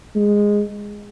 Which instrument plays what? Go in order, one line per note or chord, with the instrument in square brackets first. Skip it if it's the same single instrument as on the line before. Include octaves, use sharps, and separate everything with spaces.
[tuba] G#3